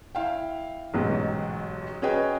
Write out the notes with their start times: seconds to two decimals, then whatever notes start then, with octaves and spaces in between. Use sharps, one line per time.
0.15 E4 F5 G5
0.94 A1 G#2 B2 F#3
2.02 C#4 F#4 G#4 B4 D#5 G5